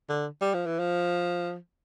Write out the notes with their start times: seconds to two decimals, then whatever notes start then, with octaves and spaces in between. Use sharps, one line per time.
0.10 D3
0.41 G3
0.54 F3
0.66 E3
0.79 F3